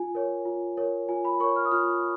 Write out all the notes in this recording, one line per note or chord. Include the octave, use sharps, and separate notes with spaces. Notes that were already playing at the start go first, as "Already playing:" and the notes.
Already playing: F4 G#5
A#4 C#5
F4
A#4 C#5
F4 G#5
B5
A#4 C#5 C#6
F6
D#6
F4 F6